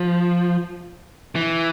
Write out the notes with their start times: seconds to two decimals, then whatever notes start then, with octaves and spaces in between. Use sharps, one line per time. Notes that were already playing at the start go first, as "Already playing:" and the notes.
Already playing: F3
1.36 E3